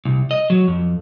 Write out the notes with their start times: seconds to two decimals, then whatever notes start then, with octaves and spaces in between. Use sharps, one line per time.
0.05 C2
0.31 D#5
0.50 F#3
0.68 F2